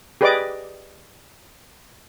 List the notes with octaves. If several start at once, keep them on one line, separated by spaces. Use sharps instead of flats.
G4 G#4 B4 D5 D#5 D6